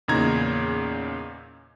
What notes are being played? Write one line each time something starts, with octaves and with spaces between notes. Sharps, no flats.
E2 A#2 C#3 D#4 A#5 G#6